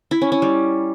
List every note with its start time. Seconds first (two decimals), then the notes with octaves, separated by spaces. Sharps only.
0.11 E4
0.21 C#4
0.32 C#4
0.42 G3